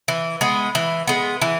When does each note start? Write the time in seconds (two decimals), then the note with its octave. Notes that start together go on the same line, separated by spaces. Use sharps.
0.08 E3
0.41 G#3 B3
0.75 E3
1.07 G#3 B3
1.42 E3